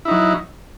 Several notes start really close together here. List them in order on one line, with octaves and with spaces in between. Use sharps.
E4 D#4 F#3